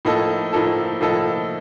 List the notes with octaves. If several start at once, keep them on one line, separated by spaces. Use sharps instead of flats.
A2 F3 A#3 D#4 A4
A2 F3 A#3 D#4 A4
A2 F3 A#3 D#4 A4